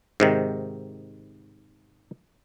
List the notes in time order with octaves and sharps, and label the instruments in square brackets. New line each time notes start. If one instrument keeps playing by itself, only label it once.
[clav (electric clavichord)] G#2 C3 D#3